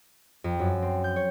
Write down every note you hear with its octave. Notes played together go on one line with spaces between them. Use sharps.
F2
F#2
C4
G6
C#5